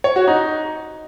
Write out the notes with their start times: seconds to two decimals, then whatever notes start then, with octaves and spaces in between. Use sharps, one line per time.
0.04 C#5
0.16 F#4
0.28 D#4